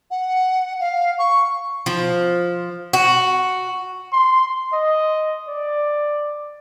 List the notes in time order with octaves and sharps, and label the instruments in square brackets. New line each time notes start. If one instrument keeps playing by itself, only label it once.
[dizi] F#5
F5
C#6
[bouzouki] F3
F#4
[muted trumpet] C6
D#5
D5